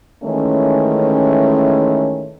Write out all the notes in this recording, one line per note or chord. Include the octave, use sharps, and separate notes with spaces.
D#3 E3 G#3 A3 C#4